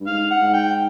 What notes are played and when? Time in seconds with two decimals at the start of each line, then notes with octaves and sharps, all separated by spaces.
0.01 G2
0.07 G#2 F5
0.31 F#5
0.42 G#2
0.53 G5